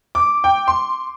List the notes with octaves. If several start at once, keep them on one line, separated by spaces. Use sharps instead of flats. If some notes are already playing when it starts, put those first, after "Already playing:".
D6
G5
C6